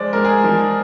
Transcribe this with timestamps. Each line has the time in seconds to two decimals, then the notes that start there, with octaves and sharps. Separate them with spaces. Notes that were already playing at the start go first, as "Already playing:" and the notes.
Already playing: F3 G#3 C5 D5
0.13 G#3 A#4
0.24 G#4
0.44 F3 A#4